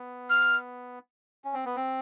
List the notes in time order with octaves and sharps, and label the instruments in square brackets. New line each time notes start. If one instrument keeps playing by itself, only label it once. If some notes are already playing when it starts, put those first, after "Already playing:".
Already playing: [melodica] B3
[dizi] F6
[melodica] C#4
C4
B3
C4